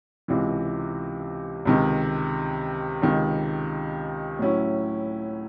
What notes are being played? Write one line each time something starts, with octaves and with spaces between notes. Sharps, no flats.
C#2 C3 E3
C#2 C3 D#3
C#2 C3 D#3
A2 F#3 C#4 E4